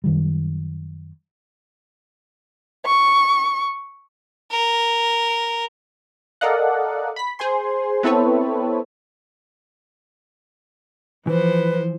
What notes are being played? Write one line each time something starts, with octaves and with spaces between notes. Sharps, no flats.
F#2 D#3 G3
C#6
A#4
A4 A#4 D5 D#5 F5 F#5
B5 B6
G#4 C5 G#5 C6
B3 C4 E4 A4 B4 C#5
E3 F3 B4 C5